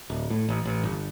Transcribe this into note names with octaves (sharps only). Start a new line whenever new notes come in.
D1
A2
A1
A1
G1